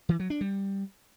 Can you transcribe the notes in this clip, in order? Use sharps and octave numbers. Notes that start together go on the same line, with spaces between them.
E3
F#3
D4
G3